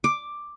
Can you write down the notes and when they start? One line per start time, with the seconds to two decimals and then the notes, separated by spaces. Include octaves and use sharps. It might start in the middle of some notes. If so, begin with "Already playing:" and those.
0.04 D6